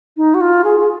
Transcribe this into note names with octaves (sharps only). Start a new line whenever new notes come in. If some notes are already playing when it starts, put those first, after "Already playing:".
D#4
F#4
F4
G#4
G#4